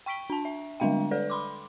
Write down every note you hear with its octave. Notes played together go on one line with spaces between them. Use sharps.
G5 C#6 B6 D7 G7
D4 A5
E5
D3 G3 G#3 D4 F5 G5
A4 B4 D5
B5 C6 D6